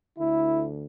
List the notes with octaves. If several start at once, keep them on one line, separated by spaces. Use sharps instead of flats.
D2 D3 E4